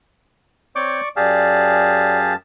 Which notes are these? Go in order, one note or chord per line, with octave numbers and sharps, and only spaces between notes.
C4 C#5 D5 C#6 D6 G6
F#2 G4 G#4 D5 F5 A5